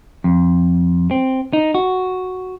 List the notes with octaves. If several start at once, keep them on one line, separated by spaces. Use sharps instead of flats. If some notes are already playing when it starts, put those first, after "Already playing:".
F2
C4
D#4
F#4